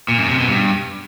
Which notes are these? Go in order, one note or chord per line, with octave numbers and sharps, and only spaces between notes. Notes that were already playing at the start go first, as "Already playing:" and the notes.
A#2
F#2
C3
B2
G2